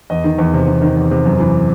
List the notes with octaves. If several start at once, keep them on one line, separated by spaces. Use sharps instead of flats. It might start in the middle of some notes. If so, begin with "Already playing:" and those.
E2 D#5
D#3
E2
C3
E2
D#3
E2
C3
F#2
E3